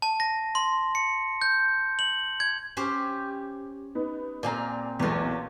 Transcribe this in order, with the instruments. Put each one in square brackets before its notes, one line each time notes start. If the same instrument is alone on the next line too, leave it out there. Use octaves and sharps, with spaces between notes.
[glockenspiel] A5
A#6
C6
C#7
G6
F#7
G#6
[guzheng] C#4 G4 C5
[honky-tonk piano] B3 D#4
[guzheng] A#2 C4 F5 [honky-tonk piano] D5 G#5 A#5
[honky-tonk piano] B1 E2 [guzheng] F4 C#5